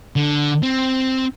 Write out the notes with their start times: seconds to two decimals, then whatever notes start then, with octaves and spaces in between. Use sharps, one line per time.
0.16 D3
0.63 C4